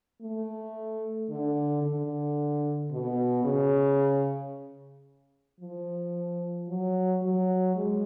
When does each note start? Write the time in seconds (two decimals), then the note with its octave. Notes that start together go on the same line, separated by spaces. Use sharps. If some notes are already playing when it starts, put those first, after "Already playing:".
0.22 A3
1.29 D3
1.82 D3
2.91 B2
3.44 C#3
5.60 F3
6.68 F#3
7.22 F#3
7.75 G#3